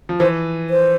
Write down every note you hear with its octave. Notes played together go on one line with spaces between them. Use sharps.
F3
E3 C5
C5